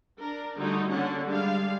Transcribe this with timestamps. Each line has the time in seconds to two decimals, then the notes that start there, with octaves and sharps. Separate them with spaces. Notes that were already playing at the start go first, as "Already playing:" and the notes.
0.19 D4 A#4
0.58 D3 G3 A3 D#4 F#4
0.91 D3 A#3 C#4 F#5
1.25 G3 G#3 D4 F5